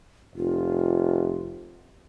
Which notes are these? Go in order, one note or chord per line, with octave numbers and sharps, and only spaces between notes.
F1 F4